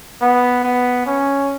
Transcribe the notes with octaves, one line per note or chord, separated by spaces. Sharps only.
B3
B3
C#4